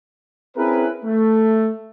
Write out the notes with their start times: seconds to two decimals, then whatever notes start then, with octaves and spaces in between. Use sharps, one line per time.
0.57 C4 C#4 E4 G#4 A#4 B4
1.05 A3